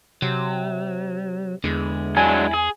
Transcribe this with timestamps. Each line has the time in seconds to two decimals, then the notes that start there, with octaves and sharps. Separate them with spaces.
0.22 C3 F#3
1.64 E2 D3 G#3
2.17 F#3 G#3 D4 E4 G#5
2.54 G#4